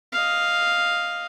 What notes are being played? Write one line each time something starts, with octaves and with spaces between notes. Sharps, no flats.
D#5 F5